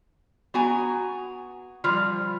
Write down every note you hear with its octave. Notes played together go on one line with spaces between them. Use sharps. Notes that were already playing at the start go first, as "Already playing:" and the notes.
B3 F#4 G#5 A#5
F3 G3 F4